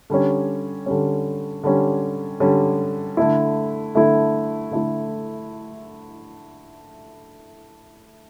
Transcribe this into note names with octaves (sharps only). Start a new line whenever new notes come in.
D3 G3 C#4
D3 G3 C#4
D3 G3 C#4
D3 G3 C#4
D3 A3 E4
D3 A3 E4
D3 A3 E4